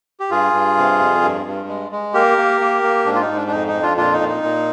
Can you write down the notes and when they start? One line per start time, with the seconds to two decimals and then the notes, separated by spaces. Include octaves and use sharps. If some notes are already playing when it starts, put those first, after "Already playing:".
0.20 G4
0.30 G2 F4 G#4
0.53 G2
0.77 C3
1.00 F2
1.22 G2
1.46 G2
1.68 G#3
1.92 G#3
2.14 A#3 G4 A#4
2.38 A#3
2.61 A#3
2.83 A#3
3.05 G#2 D4
3.15 F4
3.21 D#4
3.29 G#2
3.37 D4
3.47 D4
3.51 F2 D#4
3.68 D#4
3.74 F2
3.83 D4 F4
3.97 A#2 D4 F4
4.13 D#4
4.21 A#2
4.29 D#4
4.43 A#2